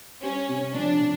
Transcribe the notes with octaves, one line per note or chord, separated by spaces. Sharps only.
G3 C#4
C3
F3 D4
F3